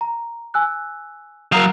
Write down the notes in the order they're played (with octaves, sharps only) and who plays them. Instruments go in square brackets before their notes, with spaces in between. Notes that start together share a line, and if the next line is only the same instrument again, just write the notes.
[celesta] A#5
G#5 E6 F#6
[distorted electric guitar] F#3 F5 [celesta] A#4 A#5 D#6